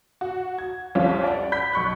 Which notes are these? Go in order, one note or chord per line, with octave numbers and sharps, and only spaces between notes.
F#4
G#6
C2 F2 C#4 F4 F5
D5 F#5
B5 G6 B6
B1 C#6 F#6